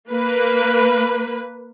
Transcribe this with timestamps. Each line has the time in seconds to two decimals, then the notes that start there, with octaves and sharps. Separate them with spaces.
0.11 A#3 B4